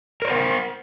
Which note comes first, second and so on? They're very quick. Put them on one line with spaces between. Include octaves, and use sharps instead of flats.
A#4 C#5 C5 F#5